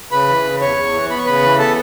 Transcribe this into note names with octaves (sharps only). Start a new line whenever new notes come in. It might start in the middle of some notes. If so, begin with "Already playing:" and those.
C#3 B4 B5
E3
C#3
E2 C#5 C#6
E2
E3
B3 B5
C#6
C#3 B4 B5
E3
B3 A4 A5